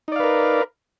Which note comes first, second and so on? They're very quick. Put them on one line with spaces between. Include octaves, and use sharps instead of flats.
D#4 D5 F5 B4 A#4